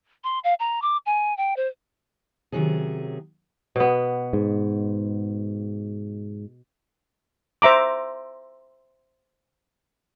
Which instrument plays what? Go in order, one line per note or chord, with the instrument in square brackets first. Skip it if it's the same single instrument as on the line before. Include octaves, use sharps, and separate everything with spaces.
[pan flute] C6
F5
A#5
D6
G#5
G5
C5
[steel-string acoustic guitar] C3 D#3 F#3 C#4 G#4
[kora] B2 B3
[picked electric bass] G#2
[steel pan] C5 E5 A#5 D6